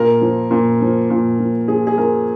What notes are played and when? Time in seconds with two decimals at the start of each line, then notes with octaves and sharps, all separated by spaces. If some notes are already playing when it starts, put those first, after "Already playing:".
Already playing: A#2 A#4
0.22 F3
0.51 A#2
0.81 F3
1.10 A#2
1.39 F3
1.68 F3 G#4
1.87 G#4
1.98 F3 A#4